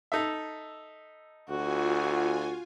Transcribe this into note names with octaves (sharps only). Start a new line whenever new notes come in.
D#4 A4 E5
D2 F4 F#4 G#5